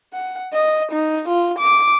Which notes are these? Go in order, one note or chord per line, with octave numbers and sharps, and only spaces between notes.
F#5
D#5
D#4
F4
D6